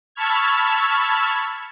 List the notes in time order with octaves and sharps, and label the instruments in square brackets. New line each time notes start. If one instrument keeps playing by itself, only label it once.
[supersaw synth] A5 B5 C#6 E6 F6 G#6